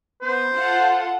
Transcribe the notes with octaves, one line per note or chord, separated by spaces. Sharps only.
B3 C5
F4 A4 F#5